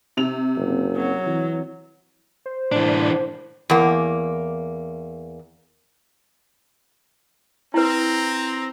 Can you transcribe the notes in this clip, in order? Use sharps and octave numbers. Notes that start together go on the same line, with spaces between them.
C3 F7
F#1
F#3
E3
C5
A2 E3 D4 D5
E2 A#3
C4 E4 B4 A#5